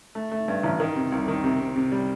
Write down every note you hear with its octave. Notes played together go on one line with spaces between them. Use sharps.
A3
A3
G2
A1
D#3
C3
C2
D#3
C3
C3
C3
G3